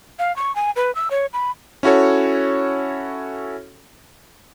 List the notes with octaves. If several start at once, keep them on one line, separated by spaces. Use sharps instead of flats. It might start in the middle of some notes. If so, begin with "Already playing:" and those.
F5
C#6
G#5
B4
E6
C#5
B5
C#4 E4 F#4 A4 C#5